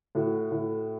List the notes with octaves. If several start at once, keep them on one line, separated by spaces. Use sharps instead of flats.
A2 F#4
A2